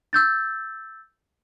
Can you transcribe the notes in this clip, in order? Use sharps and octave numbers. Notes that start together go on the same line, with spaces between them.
E6 G6 A6